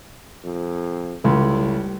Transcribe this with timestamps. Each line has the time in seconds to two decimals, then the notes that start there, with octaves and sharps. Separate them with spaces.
0.44 F2
1.25 C#2 A2 G3